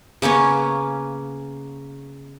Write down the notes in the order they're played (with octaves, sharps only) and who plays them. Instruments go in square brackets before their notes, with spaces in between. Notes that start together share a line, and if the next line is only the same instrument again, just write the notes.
[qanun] C#3 A#3 B3 C#4